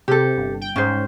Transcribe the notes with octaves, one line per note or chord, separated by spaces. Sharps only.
C3 G4 A4
G1
G5
G#2 C#4 C5